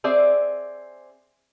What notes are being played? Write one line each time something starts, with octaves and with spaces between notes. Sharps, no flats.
C4 G#4 D5 E5